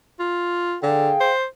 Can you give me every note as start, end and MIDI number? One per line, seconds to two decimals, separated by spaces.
0.20 0.75 65
0.83 1.12 50
0.83 1.32 68
0.83 1.32 77
0.83 1.32 79
1.21 1.45 72